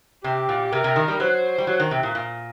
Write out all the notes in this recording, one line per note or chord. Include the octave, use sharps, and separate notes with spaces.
C3 G4
A#2
C3 A#4
C3
D#3
G3
F#3 C5
G3
F#3
D#3
C3
A#2
A#2